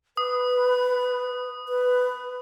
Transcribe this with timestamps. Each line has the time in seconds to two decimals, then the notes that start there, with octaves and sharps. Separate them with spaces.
0.17 B4 D#6
1.69 B4